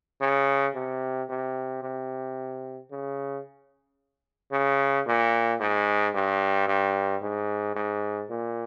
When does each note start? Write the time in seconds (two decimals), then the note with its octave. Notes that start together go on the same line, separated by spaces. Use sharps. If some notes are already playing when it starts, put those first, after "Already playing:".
0.21 C#3
0.75 C3
1.30 C3
1.83 C3
2.91 C#3
4.52 C#3
5.07 A#2
5.61 G#2
6.15 G2
6.68 G2
7.22 G#2
7.76 G#2
8.30 A#2